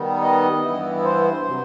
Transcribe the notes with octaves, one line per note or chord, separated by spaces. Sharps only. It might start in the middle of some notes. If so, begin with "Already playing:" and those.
Already playing: D#3 G3 B3 D#4
D#5
G2 E3 B3 E4
C5
C3 F#3